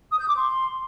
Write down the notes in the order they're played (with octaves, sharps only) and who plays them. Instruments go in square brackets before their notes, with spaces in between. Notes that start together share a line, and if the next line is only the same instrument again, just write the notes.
[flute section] D#6
G6
D6
C6